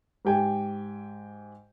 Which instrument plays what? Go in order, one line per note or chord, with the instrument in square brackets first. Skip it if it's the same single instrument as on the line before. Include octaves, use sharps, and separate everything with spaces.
[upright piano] G#2 G4 G5 G#5